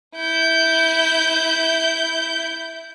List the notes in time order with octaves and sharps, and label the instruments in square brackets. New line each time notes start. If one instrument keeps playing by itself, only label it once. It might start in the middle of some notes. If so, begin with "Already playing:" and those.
[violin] E4 G6